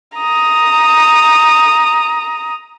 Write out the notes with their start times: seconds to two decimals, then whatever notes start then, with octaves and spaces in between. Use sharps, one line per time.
0.17 A#5 D#6